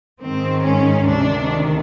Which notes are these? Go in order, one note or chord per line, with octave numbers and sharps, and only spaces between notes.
G#2 D#3 C4
C#4
D2 C3 D#3 D4